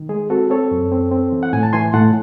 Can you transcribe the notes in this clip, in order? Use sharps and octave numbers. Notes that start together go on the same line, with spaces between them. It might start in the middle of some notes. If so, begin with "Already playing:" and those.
Already playing: D#3
G#3 G#4
C4 F#4 A4
C4 A4 C#5
F#2
C4
C4
E3
F#5
A2 G#5
A5
E3 G#5 C6
A2 F#5 A5